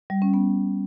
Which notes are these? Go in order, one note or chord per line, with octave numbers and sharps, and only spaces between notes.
G3
C#4
B3